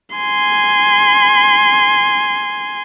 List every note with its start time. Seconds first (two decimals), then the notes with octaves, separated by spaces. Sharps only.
0.16 G#5 C6